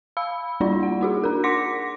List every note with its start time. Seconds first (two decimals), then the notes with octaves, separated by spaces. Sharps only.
0.17 F5 B5 E6
0.60 G3 A#3 D4 E4 F4 D5
0.83 F#5
1.01 D#4 F#4 G#4
1.24 D4 A#4
1.44 F#5 C6 D6 A#6 B6 C#7